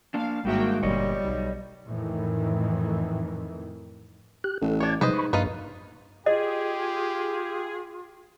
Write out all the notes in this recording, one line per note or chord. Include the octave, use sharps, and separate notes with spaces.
A#3 D4 F5
G#1 G3 G#3 A#3 F#4 E5 G5
G1 A#2 G3 C#5 D#5
B1
F2 A2 D#3 E3
G4 F#6
A1 A4
D4 C#5 G#6
G#2 C3 F#3 G3 B4 C5 D#5
B5 C#6
A#1 G2 D#4 F4 B4
F4 G4 G#4 D#5